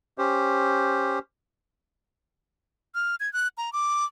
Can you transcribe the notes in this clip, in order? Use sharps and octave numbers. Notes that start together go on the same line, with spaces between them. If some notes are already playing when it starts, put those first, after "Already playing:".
C#4 G4 C5
F6
G#6
F#6
A#5
D6